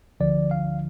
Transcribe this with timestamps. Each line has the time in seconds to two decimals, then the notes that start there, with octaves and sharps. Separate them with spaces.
0.20 D2 D3 F3 D5
0.51 F5